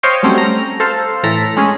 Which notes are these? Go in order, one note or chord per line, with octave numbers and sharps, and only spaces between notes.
C5 C#5 D#5 F5 G5
F#3 G3 A3 C4 C#4
A#5
A4 C5 F5
A2 E3 A4 A#5 B6
G#3 C#4 G#4